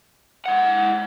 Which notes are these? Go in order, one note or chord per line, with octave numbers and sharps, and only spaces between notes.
G#3 F#5